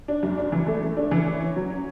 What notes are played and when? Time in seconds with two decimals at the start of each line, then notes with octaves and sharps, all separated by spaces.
0.08 D4
0.23 F#2
0.37 D4
0.52 E3
0.66 A3
0.82 A3
0.97 D4
1.11 E3
1.26 C#4
1.41 C#4
1.56 F#3
1.70 C#4